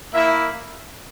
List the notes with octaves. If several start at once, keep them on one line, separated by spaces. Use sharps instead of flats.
A#3 E4 E5